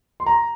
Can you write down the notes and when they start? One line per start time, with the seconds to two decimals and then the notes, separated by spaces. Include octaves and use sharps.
0.20 C6
0.26 A#5